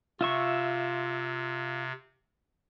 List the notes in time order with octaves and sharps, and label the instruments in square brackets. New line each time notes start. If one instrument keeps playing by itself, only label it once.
[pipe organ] C3 [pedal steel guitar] F4 E5 C#6